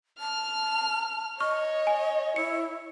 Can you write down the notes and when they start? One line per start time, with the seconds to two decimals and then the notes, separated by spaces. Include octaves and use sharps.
0.20 A5 F6
1.40 C#5 D#5 C#6 F6
1.87 G#5
2.36 E4 C#7